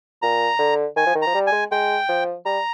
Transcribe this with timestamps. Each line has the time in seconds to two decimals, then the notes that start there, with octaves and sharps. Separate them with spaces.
0.22 A#2 A#5
0.59 D3
0.96 D#3 G#5
1.06 F3
1.15 D#3
1.22 F3 A#5
1.34 G3
1.47 G#5
1.52 G#3
1.71 G#3 G5
2.08 F3
2.46 G3 A#5